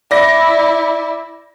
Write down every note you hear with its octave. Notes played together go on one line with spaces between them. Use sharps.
E4 D5 A#6